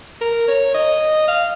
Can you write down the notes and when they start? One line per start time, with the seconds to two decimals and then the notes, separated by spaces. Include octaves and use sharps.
0.21 A#4
0.48 C#5
0.75 D#5
1.28 F5